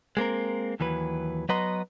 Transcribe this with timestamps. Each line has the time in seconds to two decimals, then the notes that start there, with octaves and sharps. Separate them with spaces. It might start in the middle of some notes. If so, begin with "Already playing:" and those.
0.17 G#3 A#3 C4 A#4
0.80 D#2 E3 F#3 B4
1.49 F#3 B3 B4 D#5 A#5 C6